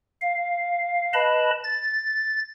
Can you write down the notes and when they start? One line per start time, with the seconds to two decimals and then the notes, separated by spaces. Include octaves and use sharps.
0.22 F5
1.13 B4 D#5 A5 B5
1.64 A6